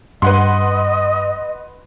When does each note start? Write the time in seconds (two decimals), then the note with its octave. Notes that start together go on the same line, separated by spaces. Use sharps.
0.22 G2 B4 D#5 F#5 C6